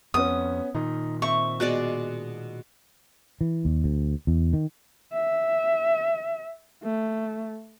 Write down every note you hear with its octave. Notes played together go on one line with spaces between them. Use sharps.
F2 B3 C#4 D#6
A#2 D#3 D#4
C4 E5 C#6
B2 G#3 D5 F#6
E3
D#2
D2
E2
D#3
E5
A3